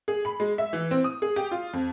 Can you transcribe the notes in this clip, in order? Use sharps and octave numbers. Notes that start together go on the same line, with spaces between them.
G#4
B5
G#3
E5
E3
C4
D#6
G#4
G4
F4
F2